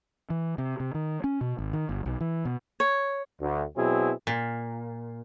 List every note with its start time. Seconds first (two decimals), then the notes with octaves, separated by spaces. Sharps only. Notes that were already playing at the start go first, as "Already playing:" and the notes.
0.30 E3
0.58 C3
0.80 C3
0.94 D#3
1.24 C#4
1.41 B2
1.58 G#1
1.73 D#3
1.89 G1
2.06 B1
2.20 E3
2.45 B2
2.80 C#5
3.41 D2
3.77 B2 F#3 C4 E4 G#4
4.27 A#2